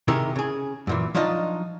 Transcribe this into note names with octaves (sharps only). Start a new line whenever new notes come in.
C3 D#3 E4 G4 G#4 A#4
C#3 G#4
F#2 A#2 E3
F3 F#3 D4 D#4 F4 D#5